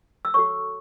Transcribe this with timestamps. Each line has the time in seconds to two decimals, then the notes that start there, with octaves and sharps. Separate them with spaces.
0.25 E6
0.34 F#4 A4 C#5 C#6